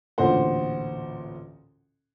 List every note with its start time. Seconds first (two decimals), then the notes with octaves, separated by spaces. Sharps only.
0.18 A1 D2 A#2 C5 F#5